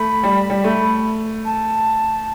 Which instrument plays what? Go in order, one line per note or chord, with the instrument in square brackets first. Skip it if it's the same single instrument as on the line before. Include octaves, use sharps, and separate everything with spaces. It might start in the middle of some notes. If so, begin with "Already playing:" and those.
Already playing: [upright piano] A3 [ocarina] B5
[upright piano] G3
G3
A3
[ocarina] A5